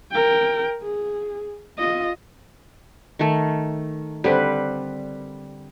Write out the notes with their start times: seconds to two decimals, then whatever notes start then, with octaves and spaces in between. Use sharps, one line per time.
0.11 A#4 G5
0.82 G#4
1.79 F4 D#5
3.19 D#3 A3
4.24 D3 G3 C4 B4